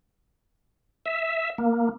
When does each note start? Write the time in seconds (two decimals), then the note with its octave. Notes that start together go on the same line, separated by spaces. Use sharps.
1.06 E5
1.58 A#3